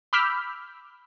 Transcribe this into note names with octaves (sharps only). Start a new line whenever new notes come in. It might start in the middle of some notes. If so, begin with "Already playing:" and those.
B5 D6 E6 F6 G6 B6